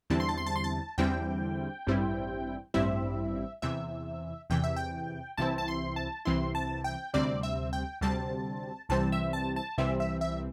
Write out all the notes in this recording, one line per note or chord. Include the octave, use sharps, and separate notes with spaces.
E2 D3 G3 C4 E4 A5
C6
A5
C6
A5
C6
A5
E2 D3 G3 C4 E4 G5
A1 G2 G3 C4 E4
A1 G2 G3 C4 E4 E5
E2 C3 E3 E5
E2 C3 E3 G5
E5
G5
C2 C3 E3 C4 E4 A5
A5
C6
A5
C2 C3 E3 C4 E4 C6
A5
G5
D2 C3 G3 C4 D5
E5
G5
D2 C3 G3 C4 A5
C2 C3 E3 G3 C4 A5
E5
A5
A5
C2 C3 E3 G3 C4 E5
E5
E5